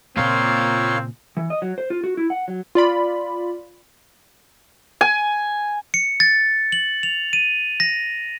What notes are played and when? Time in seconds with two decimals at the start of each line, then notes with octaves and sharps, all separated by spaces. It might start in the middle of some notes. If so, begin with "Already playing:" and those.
0.17 A#2 C#3 A#3 C4 F4 A#4 C#5 F5
1.37 E3
1.50 D#5
1.62 F#3
1.78 C5
1.90 F4
2.04 F#4
2.17 E4
2.30 F#5
2.48 F#3
2.75 F4 D5 B5
5.01 G#5
5.94 C#7
6.20 A6
6.72 F#7
7.03 F7
7.33 D#7
7.80 A#6